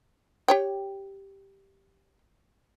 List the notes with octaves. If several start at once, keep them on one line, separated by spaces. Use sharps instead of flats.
G4 C#5 G5